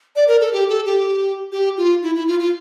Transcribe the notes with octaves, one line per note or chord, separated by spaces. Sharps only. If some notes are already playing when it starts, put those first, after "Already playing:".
D5
A#4
A4
G4
A4
G4
G4
F4
E4
E4
F4
F4